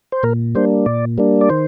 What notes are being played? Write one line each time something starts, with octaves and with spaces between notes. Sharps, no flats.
C5
A#2 A#4
G3 A#3 D4 C5
A#2 D5
G3 A#3 D4
D5
D#3 C5